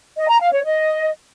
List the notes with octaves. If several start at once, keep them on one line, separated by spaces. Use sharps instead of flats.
D#5
A#5
F5
C#5
D#5